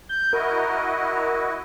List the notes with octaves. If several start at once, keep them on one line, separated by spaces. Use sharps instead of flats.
G6
E4 F#4 A#4 D#5